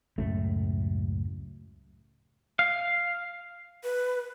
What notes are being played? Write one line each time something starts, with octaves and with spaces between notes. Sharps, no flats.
C#2 F#2 A2 A3
F5
B4